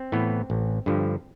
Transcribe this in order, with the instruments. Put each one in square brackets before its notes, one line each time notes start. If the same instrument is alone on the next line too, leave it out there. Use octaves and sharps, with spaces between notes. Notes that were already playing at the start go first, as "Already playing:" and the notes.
Already playing: [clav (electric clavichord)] C4
A2 E3 B3
A1
G2 D3 F3